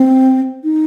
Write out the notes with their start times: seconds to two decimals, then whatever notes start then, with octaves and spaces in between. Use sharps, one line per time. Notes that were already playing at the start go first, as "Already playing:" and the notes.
Already playing: C4
0.64 D#4